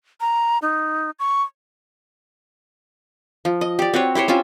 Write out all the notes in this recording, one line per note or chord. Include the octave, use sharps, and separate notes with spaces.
A#5
D#4
C#6
F3
D#5
G4 D5
C4 F#4 B4 C#5
E4 G4 C5 C#5
C4 C#4 F4 E5